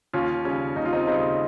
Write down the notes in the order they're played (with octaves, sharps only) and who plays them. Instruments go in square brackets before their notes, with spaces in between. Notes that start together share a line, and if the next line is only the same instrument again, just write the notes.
[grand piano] D#2 C#4 F4
C#3 G3 C#4
D#2 D#4
F4
C4 D#4
C#3 G3 C4 D#4